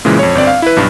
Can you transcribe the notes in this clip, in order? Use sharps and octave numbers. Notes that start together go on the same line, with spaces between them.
A#2 C#3 E3 G#3
F2 C#5
G1 C4 D5
F5
E4 B4
B1 G2